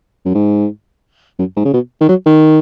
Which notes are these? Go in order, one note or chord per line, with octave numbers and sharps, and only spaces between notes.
F#2
G#2
F#2
G#2
C#3
B2
D#3
F#3
D#3